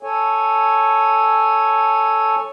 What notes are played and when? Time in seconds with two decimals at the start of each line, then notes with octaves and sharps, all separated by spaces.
0.03 A4 C#5 G#5